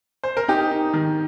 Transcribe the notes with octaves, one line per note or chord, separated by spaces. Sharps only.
C5
A#4
D#4 G4
D#4
D#3